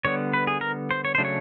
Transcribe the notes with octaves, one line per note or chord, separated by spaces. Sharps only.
D3 G3 B3 C#5
B4
G#4
A#4
C5
C#5
C#3 F#3 A3 D4 C5
C#5